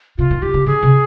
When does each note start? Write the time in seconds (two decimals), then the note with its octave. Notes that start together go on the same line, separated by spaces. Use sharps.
0.18 C3 F4
0.31 D#3
0.42 D#3 G4
0.54 D3
0.66 D3 G#4
0.83 C3